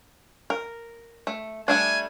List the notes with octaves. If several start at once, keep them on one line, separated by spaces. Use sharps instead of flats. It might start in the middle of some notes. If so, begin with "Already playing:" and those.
A#4
A3
G3 A3 D4 G#5